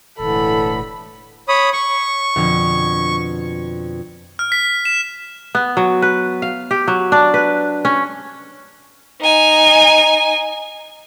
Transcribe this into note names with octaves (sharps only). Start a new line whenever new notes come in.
E1 A2 D3 E3 A4 B5
C#5 B5 D#6
C#6 C#7
F2 B2 D3
F6
B6
E7
B3
F#3
B4
F5
G4
F#3
D4
B4
C#4
D#4 G#5